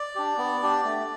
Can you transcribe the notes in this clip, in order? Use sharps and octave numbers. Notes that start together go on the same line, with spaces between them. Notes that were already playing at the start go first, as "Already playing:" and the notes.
Already playing: D5
D4 G4
B3
D4 G4
A3